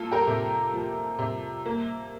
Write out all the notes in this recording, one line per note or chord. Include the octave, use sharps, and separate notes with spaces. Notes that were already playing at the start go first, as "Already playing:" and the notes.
Already playing: A#3 F4 A4
G4 A#4
C3
F3
C3
A#3